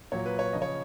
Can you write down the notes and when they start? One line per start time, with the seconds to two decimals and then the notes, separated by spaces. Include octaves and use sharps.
0.12 A#2 F#3 C#5
0.26 B4
0.39 C#5
0.53 C#3 F3 D#5
0.62 C#5